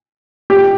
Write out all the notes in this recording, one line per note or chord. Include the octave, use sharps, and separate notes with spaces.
G4